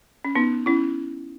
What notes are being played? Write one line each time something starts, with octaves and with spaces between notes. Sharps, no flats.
C#4
B3 D#4
C#4 E4